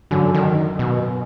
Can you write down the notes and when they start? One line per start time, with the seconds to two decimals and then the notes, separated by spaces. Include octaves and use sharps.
0.11 F#2 D3 F#3
0.34 D#3
0.79 B2